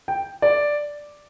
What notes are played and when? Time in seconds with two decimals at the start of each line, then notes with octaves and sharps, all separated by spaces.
0.08 G5
0.42 D5